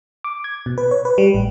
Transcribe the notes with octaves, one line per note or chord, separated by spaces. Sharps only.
D6
G#6
B2
B4
C#5
B4
G3
A1